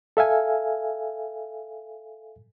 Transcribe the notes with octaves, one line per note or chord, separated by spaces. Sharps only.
A4 E5 F5 G#5